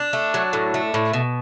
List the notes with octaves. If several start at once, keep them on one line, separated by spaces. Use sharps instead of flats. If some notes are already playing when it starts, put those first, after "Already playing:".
Already playing: D4
A3
F#3
A2
A3
A2
B2